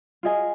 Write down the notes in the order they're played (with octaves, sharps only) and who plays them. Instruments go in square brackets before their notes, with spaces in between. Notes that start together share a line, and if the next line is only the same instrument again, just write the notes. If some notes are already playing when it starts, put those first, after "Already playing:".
[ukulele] F4 G#4 D#5 G#5